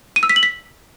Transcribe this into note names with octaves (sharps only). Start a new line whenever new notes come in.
D#7
E6
B6
F#7
B6